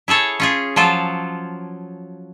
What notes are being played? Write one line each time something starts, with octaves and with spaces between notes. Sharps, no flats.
E4 G#4 A4 C#5
C#4 F4 G#4
F3 F#3 F4 A4